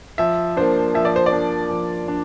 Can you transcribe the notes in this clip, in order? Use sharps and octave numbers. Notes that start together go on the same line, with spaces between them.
F3 E5
A#3 D4 C5
F3 E5
D5
C5
D5
A#3 D4
F3
D4